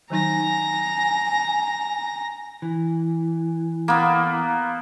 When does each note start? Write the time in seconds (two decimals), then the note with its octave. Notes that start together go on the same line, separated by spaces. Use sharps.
0.10 D#3 F#3 D#4 G#5 A#5 A#6
2.62 E3
3.88 A#3 B3